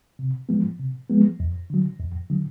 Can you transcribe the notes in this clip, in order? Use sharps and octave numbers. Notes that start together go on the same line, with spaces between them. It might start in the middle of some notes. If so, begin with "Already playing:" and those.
C3
F3 G#3 B3
C3
F3 G#3 B3
F2
D3 F#3
F2
D3 F#3